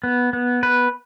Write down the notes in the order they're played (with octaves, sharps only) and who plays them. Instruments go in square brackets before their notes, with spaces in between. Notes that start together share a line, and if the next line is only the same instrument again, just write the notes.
[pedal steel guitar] B3
B3
B4